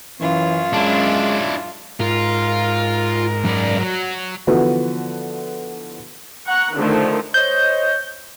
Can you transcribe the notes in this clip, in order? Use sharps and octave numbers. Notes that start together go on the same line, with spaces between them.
F#2 E3 C#4 F4
G#3 D4 E4
G#2 F4 A#4
F#2 D5
F#3
D3 E3 F3 B3 F#4 B4
F#5 A#5 C#6 F#6
D3 D#3 F3 A3
C5 C#5 D#5 G6